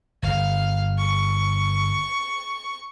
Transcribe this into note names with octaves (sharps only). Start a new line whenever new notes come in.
G1 F5
C#6